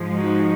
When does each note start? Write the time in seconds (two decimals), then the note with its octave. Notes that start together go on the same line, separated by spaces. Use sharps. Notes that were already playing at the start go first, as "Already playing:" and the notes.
Already playing: G#2 F3 G#3
0.13 D#4 F#4